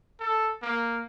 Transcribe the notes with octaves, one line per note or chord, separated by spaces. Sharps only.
A4
A#3